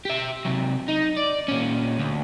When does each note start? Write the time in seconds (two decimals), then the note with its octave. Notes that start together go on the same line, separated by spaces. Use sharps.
0.05 G4 E5
0.45 C3 F#3
0.88 D#4
1.16 D5
1.48 A#2 C#4
1.99 D2